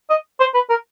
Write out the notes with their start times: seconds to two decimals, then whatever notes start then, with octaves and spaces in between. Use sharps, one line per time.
0.10 D#5
0.40 C5
0.55 B4
0.70 A#4